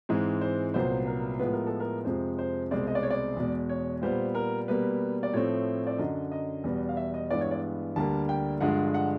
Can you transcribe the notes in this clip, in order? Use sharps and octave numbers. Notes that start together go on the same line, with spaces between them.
G#2 E3 G#3 C4
C5
C2 A#2 F#3 B3 C5
A#4
A2 F3 G#3 B3 B4
A#4
A4
A#4
F2 C3 F3 G#3 C5
C5
C2 B2 G#3 C4 D5
D#5
D5
C#5
D5
E2 B2 G#3
C#5
A#2 G3 B3 C5
A#4
B2 G3 A#3 B4
D5
A2 F3 A3 C4 C#5
D5
F#2 D3 F#3 D#5
D#5
E2 B2 G3 B3
F5
E5
D#5
G2 E3 G#3 B3 D5
C#5
D5
D2 D3 G3 A#3 A5
G5
G2 D3 F3 G#3 F#5
F#5